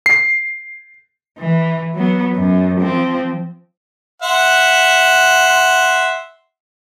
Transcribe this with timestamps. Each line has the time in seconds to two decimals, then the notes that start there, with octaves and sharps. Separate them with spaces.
0.06 C7
1.38 E3
1.94 F#3 B3
2.35 F#2
2.81 F3 C4
4.22 E5 F#5 C6